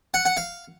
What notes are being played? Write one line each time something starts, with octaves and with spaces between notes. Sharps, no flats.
F#5
F#5
F5